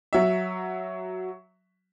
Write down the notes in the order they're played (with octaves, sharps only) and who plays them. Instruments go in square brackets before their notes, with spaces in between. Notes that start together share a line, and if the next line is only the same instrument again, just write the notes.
[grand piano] F#3 E5